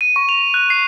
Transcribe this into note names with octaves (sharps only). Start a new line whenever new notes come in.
D#7
C#6
F7
F#6
C7